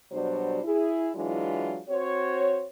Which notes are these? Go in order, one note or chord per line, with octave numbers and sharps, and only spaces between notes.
B2 F#3 G3 D4 C5
E4 G#4
E3 F#3 G#3 D4 E4 F4
C4 F#4 C5 C#5